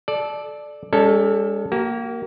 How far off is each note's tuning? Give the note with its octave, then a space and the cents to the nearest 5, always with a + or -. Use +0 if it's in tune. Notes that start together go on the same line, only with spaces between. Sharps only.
A4 -20 D5 +10
G#3 -45 C#4 +30 A4 +0
A#3 +0 G4 -45